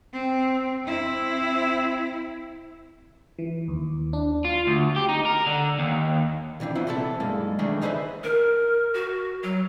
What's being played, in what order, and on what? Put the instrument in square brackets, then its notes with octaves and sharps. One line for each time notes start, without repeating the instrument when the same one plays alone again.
[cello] C4
C4 E4
[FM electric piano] E3
D#2
D4
[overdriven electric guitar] F4
D2
G4
D#4
A#4
D3
D#2
[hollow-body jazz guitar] A#2 E3 C4 D4
B3 E4 F4 C5 E5
C3 E3 B3 E4 A4
B1 G2 G#3 A#3 A4
D#3 E3 A3 D4 G#4 A#4
D#4 G#4 B4 C5 D#5 E5
[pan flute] A#4
F#4
F#3